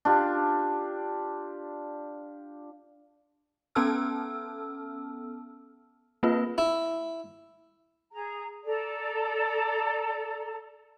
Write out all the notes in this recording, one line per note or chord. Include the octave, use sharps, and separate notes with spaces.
D4 F4 G4
B3 C#4 A4 A5 E6 F6
A#3 C4 F4 B4
E4
G#4 A#5
A4 D5 A#5